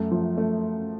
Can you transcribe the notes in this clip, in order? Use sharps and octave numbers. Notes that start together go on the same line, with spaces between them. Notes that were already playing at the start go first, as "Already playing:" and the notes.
Already playing: F#2 A3
F3
A3